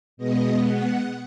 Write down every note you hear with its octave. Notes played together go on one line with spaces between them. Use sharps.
B2 G#3 B3 D#5
F#5